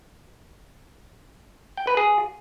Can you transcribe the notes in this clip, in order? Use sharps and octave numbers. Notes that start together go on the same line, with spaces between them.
G5
B4
G#4